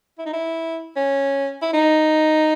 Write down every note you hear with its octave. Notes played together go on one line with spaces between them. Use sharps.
E4
D#4
E4
C#4
E4
D#4